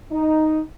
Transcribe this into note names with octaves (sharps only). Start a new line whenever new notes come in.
D#4